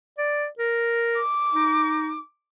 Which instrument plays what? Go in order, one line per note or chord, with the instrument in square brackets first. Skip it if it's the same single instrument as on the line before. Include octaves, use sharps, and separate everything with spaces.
[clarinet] D5
A#4
[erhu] D6
[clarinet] D#4